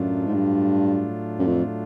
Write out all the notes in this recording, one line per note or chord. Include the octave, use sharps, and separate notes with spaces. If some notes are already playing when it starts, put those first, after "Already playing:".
Already playing: F#2 A2 F#3 A3 D4 F4
G#2
G2
F#2
F2